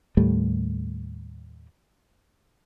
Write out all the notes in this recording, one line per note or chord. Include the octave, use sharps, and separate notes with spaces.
D#2 A2 G3 A3